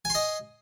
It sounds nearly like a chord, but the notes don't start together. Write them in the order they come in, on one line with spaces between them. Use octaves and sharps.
G#5 C6 D#5